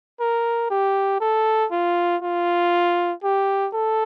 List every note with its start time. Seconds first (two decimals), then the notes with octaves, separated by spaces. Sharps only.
0.20 A#4
0.70 G4
1.20 A4
1.71 F4
2.22 F4
3.23 G4
3.74 A4